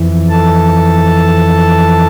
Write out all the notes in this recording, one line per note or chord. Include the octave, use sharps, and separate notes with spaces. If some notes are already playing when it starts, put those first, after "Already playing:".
Already playing: F2 E3
A4 A5